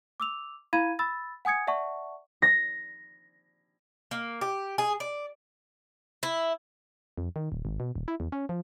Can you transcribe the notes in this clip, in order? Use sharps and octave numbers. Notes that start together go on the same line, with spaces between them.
D6 E6 F7
E4 F5 B5 G#6 D#7
B5 E6 A6
F#5 G#5 D#6 G#6 C#7
D5 E5 F#5 A5 C#6
A#6
A#3
G4
G#4
D5
E4
F2
D#3
D#1
G#1
B2
D#1
E4
E2
C#4
F3